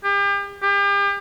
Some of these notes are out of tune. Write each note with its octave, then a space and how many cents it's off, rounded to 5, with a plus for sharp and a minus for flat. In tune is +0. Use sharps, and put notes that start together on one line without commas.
G4 +35
G4 +40